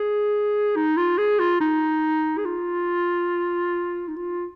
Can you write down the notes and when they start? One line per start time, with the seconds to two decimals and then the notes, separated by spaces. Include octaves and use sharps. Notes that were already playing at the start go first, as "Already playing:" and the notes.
Already playing: G#4
0.76 D#4
0.97 F4
1.18 G#4
1.39 F4
1.61 D#4
2.38 G#4
2.45 F4
4.08 D#4
4.17 F4